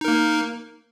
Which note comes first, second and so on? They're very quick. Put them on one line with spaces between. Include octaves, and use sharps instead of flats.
D#4 A#4 A#3